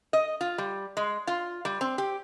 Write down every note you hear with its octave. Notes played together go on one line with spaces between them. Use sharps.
D#5
F4
G3
G#3
F4
G3
C4
G4